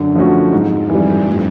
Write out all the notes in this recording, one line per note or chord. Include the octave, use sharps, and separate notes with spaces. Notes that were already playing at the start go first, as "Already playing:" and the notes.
Already playing: F#2 D3
F3 A3 C#4 F#4
F2 G#2
G2 E3 G3
A2